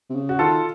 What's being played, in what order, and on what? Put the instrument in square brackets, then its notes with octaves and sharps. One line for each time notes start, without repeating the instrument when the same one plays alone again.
[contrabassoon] C3
C#3
[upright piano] F#4
[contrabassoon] D#3 [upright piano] F4 A4